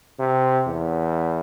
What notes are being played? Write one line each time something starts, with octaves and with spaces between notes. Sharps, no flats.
C3
E2